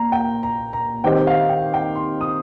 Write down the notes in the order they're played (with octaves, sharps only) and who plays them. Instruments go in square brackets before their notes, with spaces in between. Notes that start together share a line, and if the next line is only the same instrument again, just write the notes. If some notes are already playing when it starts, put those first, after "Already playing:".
Already playing: [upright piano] A#2 [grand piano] A#5
[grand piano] G5
A#5
A#5
[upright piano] D#3 C4 G4 C5 D#5 [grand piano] G5
[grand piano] F5
G5
G5
C6
D#6